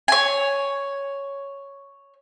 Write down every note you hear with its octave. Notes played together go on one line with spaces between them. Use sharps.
C#5 G#5